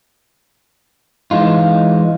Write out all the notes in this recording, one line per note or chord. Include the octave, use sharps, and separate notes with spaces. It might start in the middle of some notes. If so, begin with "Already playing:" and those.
E3 G#3 D#4 F4